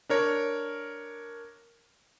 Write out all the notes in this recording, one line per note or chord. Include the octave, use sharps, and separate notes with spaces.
D4 A#4 C#5